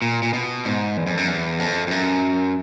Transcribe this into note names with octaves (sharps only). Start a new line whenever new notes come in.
A#2
A#2
B2
G#2
E2
F2
F#2
E2
F2
F2
F#2